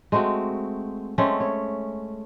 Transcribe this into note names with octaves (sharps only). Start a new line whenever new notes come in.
G#3 A3 C4 F#4
G#3 A3 C4 C#4
C#5